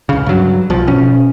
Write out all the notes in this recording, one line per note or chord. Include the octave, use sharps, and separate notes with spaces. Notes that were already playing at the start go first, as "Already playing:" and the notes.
C#2 C#3
G2 F#3
B1 F3
B2 C#4